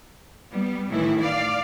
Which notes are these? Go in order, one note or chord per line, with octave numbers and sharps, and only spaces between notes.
G3 B3
A2 D#3 E3 E4
D5 F5